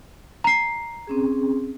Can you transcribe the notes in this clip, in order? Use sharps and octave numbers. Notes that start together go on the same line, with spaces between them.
A#5 C7
C4 C#4 G#4